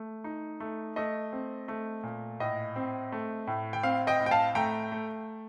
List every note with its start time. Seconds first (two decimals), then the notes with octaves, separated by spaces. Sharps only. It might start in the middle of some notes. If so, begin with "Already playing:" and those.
Already playing: A3
0.24 D#4
0.60 A3
0.96 A3 D#5
1.32 C4
1.68 A3
2.03 A#2
2.40 A2 D#5
2.76 C4
3.12 A3
3.47 A2
3.73 G5
3.83 C4 F5
4.07 D#5 G5
4.20 A2
4.26 G5
4.31 F5 A5
4.55 A3 G5 A#5
4.92 A3